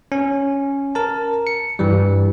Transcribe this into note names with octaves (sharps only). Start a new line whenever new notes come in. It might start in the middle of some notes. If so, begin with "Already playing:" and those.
C#4
A#4 A5
C#7
G2 E3 G3